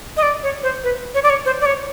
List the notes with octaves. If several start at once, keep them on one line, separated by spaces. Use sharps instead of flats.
D#5
D5
C#5
C5
B4
C#5
D5
C#5
C5
D5
C#5